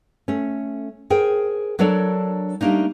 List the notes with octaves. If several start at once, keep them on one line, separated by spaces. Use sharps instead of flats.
A3 C#4
G#4 A#4 C5 G5
F#3 D4 A4 A#4 C#5 D5
G3 A3 A#3 D4 D#4